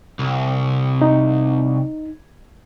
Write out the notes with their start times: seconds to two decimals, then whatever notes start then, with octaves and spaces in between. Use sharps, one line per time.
0.19 C2
1.02 D#4